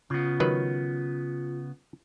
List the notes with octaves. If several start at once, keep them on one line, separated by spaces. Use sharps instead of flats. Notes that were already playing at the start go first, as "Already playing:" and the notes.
C#3 B3 F4
D#3 F#3 B4